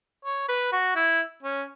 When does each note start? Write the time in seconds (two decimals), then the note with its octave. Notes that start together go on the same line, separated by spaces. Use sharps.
0.25 C#5
0.48 B4
0.72 F#4
0.96 E4
1.43 C#4